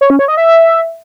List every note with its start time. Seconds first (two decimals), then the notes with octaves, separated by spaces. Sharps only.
0.01 C#5
0.10 C#4
0.19 C#5
0.28 D#5
0.37 E5